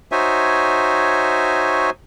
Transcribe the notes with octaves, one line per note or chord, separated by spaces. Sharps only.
D#4 F#4 C5 C#5 E5 G#5